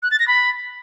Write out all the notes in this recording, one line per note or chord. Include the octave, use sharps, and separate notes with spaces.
F#6
A6
A#6
B5